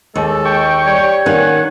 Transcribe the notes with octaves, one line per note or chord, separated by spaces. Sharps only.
D#2 G#3 A4
G5 C#6
G3 C#5
D#3 A#3 C#4 F#5 G#5